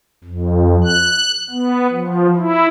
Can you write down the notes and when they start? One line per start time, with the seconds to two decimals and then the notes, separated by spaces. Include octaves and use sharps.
0.24 F2
0.84 F#6
1.50 B3
1.92 F3
2.36 E4